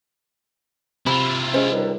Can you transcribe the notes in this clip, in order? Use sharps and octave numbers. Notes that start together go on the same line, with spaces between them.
C3 E4 F4 B5
G#3 C#4 C5
C#2 D#3 G3